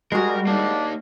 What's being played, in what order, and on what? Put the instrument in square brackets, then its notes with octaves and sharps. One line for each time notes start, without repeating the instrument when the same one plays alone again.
[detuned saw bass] G3 [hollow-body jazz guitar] G#3 F#4 [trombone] G#4 [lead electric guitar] A#4
[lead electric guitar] A#3 D#4 [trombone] D4